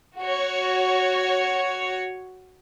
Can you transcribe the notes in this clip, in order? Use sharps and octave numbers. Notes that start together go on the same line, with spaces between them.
F#4 C#5